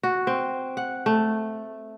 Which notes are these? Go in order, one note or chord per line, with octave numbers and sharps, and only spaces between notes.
F#4
C4
F#5
A3